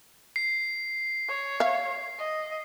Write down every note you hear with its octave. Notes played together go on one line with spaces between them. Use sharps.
C7
C#5
E5 F5
D#5